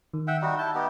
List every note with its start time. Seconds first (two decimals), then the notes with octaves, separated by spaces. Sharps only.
0.14 D#3
0.28 E5 F#5 G5
0.42 G3 D#4 F#4
0.59 E4 A5 G6
0.75 B3 D#4 G4